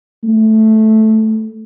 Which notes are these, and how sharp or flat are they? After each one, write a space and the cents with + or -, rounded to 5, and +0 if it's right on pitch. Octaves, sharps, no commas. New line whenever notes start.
A3 -5